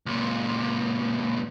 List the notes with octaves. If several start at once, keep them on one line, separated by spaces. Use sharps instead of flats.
C#2 A#2